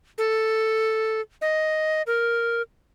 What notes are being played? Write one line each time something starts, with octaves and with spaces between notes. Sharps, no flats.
A4
D#5
A#4